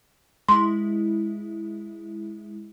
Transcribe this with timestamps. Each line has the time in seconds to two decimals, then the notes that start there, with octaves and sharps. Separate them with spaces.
0.49 G#3 E4 C6